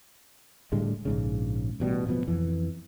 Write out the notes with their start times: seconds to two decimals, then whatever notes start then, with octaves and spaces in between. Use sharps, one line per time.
0.72 A2 D3 G3 G#3
1.05 A#1 G#2 C#3
1.80 A1 B2 G3
2.07 D1 B2 F3 B3
2.28 F2 E3